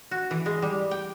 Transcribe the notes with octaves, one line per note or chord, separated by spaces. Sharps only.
F#4
E3
G#3
G3
G5